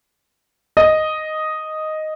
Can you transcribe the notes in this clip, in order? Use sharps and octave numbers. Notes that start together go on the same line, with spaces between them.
D#5